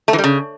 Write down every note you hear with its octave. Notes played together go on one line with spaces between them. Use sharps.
A3
E3
G3
C#3